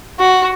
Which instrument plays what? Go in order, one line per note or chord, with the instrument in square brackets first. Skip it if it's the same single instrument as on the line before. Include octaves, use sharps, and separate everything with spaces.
[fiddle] F#4